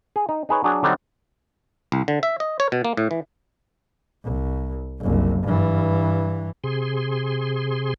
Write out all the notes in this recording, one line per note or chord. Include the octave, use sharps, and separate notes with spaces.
G#4
D#4
D#4 G#4 B4 C#5
F#3 D4 F#4 G#4
D3 F#3 G3 C4 D4 D#4
C2
D3
E5
D#5
C#5
B2
A#3
A2
E3
C2
F#1 C2
G2 E3
C3 G#4 C6